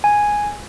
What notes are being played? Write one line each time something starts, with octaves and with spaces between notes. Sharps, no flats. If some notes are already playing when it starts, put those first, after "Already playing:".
G#5